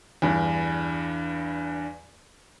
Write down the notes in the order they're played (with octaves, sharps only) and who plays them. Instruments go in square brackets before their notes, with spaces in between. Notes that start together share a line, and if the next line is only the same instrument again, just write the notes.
[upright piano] E2 G2